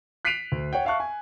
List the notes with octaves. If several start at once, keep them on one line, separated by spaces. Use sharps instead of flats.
F#6 B6 C7 D7 D#7 F7
D2
C#5 F#5 G5
E5 F5 A5 C#6 F#6
G#5